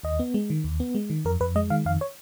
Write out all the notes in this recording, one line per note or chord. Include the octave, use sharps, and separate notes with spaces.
D#2 D#5
B3
G#3
D#3
D#2
B3
G#3
D#3
F2 A#4
F2 B4
G#3 D#5
D#3 F5
F2 F5
C#5